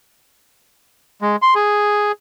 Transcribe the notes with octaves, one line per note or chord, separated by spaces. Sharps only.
G#3
C6
G#4